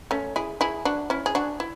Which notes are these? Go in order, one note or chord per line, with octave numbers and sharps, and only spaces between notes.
A3 C#4
E4 G#4
E4 G#4
D4 F#4
C#4 E4
G#4
D4 F#4
E4